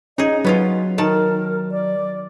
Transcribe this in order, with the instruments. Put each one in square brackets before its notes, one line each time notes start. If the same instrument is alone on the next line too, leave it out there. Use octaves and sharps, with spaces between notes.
[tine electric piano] C#4 [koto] D#4 G#4 [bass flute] D#5
[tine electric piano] F#3 [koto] B3 C#4 F4 [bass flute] D#4
[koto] D#3 A5 [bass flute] A#4
[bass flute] D5